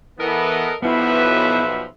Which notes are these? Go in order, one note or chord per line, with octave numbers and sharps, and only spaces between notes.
E3 B3 A4 A#4 D#5
B1 B2 F3 G3 B3 E4 B4 E5